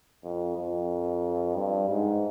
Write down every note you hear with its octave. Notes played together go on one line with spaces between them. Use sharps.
F2
F2
G2
G#2